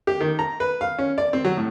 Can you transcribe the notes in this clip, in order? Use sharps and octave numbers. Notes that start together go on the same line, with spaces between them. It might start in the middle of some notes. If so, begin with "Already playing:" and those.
G4
D#3
A#5
B4
F5
C#4
D5
C4
F#3
A2